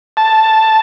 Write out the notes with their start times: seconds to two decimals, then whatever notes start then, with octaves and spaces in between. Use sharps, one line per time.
0.17 A5